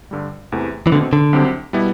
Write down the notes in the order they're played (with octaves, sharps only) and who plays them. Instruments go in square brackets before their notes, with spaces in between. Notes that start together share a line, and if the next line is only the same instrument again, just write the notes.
[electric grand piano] G2 D3 G3
E2 C3 E3 A3
[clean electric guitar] E3
[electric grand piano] B2 A3 C4 [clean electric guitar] D3
[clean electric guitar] D3
[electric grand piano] C2 C3 F#3 C4 G4
B2 G3 B3 E4